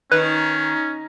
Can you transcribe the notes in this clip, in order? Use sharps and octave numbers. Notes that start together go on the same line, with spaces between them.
D#3 C#4 B4